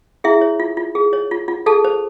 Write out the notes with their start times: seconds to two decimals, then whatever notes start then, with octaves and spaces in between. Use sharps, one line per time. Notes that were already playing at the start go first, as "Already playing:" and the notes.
0.24 E4 G#4 E5
0.41 C#5
0.60 F4
0.77 F4
0.95 G#4
1.13 C#5
1.31 F4
1.48 F4
1.66 G#4 A4 A5
1.85 C5